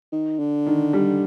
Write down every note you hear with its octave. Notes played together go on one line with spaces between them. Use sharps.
D#3
D3
D#3
G3